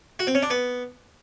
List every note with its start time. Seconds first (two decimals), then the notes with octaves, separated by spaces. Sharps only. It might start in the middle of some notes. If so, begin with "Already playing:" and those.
0.19 F#4
0.27 C4
0.35 C#4
0.43 D4
0.50 B3